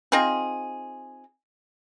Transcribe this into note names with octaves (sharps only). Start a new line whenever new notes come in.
C4 D#4 F4 G#4